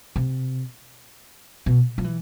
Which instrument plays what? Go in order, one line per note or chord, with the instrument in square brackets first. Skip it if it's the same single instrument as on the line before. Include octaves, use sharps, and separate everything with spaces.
[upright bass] C3
B2
F3
E3